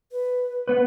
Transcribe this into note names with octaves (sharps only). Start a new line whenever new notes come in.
B4
B3 B4